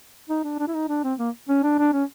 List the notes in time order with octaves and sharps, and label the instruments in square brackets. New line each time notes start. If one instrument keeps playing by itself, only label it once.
[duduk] D#4
D4
D4
E4
D#4
D4
C4
A#3
C#4
D4
D4
C#4